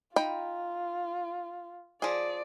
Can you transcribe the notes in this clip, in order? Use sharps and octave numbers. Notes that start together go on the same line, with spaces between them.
D#4 F4 G5 B5
F3 G#4 D5